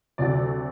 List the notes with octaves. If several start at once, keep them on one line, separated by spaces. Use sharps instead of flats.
D2 C3 F#3 D5